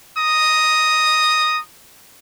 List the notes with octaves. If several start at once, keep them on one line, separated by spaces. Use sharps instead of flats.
A#5 D#6